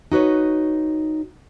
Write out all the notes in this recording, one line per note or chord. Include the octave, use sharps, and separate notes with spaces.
D#4 F#4 B4 C#5